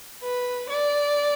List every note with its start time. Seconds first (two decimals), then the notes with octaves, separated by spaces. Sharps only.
0.22 B4
0.69 D5